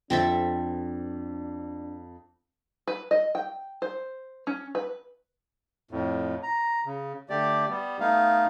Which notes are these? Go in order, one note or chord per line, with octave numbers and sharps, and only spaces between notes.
F2 C4 D4 A4 E5
B4
D#5
G5
C5
C#4
B4
F2 A2
A#5
C#3
D3 A3 G4 D5
G3 B3
A3 B3 D#4 F5